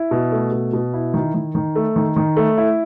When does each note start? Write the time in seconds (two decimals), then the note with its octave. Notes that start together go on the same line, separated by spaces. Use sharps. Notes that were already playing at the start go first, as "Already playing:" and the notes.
Already playing: E4
0.11 B2
0.32 A3
0.52 B2
0.73 B2
0.94 E4
1.14 D#3
1.34 D#3
1.55 D#3
1.76 A3
1.96 D#3
2.16 D#3
2.37 A3
2.57 E4